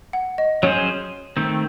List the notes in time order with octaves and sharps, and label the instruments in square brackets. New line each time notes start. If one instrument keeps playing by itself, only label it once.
[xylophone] F#5
D#5
[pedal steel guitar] F#3 C#4 G#4 C5 [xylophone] C#5
[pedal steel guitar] D#3 A3 C4